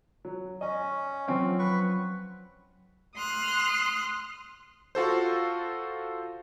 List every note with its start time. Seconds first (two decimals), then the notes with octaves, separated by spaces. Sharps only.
0.25 F#3
0.61 C#4 D#5
1.28 F3 F#3 C4 C#4
1.59 B4 C#6
3.15 C6 D#6 F6 F#6
4.95 F4 F#4 A4 C5